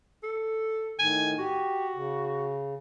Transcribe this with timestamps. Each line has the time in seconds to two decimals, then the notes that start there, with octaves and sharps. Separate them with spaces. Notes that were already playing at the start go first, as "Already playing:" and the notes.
0.23 A4
0.99 A2 D#3 G#5
1.38 F#4 G4
1.95 C#3